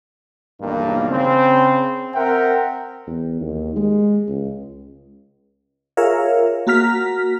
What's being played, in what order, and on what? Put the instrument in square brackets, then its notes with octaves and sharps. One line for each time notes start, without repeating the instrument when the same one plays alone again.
[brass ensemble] B1 E2 G2 D#3 A#3
C#3 C4
C4 A#4 C5 E5 F#5 G5
[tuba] E2
D#2
G#3
C#2
[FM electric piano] F4 G#4 A#4 C#5 E5 F5
A#3 F#4 A#5 F6 B6